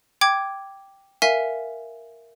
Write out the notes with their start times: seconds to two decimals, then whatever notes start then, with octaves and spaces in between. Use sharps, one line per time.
0.21 G5 D6 G#6
1.22 A#4 E5 F5 G#5 B6